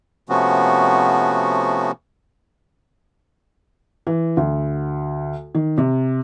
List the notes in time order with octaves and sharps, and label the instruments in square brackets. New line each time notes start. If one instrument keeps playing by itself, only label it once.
[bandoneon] C3 F3 A3 B3 C#4 F#4
[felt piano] E3
D2
D#3
C3